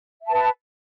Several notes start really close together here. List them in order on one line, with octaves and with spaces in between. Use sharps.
E5 A5 B4